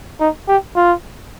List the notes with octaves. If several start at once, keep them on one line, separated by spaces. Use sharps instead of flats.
D#4
G4
F4